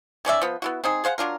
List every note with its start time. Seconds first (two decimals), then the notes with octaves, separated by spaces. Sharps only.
0.25 D#3 C#4 D5 E5
0.42 F3 B3
0.62 B3 E4 F#4
0.84 C4 D#4 G#4
1.04 G#4 C5 F5 F#5
1.18 F#3 D4 F4 A#4